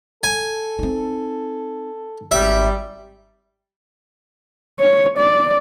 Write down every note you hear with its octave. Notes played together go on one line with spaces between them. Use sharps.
A4 G#5
C4 D#4
G#1 G3 E5
C#5
D5